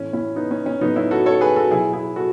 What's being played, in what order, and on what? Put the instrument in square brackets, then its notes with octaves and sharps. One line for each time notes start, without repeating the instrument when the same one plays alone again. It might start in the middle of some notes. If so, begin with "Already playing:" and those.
Already playing: [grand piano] A2 E3 C#4
C#4 E4
B3 D#4
C#4
C#4
A2 F#3 B3 D#4
C#4 E4
F#4 A4
A4 C#5
G#4 B4
F#4 A4
B2 F#3 E4 G#4
E4 G#4
F#4 A4